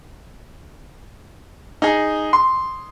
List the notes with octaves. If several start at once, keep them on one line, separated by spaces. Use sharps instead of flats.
D#4 G#4
C6